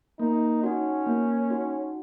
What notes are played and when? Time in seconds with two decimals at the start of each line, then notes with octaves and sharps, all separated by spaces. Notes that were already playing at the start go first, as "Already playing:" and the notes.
0.19 A#3 D#4
0.63 C#4 D#4 F#4
1.06 A#3
1.50 D#4 F#4